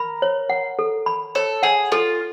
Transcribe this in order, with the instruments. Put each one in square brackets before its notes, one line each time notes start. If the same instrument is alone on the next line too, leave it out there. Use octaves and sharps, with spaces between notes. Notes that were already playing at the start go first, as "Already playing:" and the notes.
Already playing: [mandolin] A#4 [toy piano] B5
[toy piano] C#5
F#5
A4
B5
[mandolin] A4 [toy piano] C#5
[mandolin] G#4 [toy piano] F#5
[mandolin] F4 [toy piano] A4